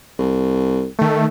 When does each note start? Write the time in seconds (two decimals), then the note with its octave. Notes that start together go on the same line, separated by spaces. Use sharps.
0.19 C2
0.99 D#3 A3